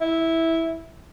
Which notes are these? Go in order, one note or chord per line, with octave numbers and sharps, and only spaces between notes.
E4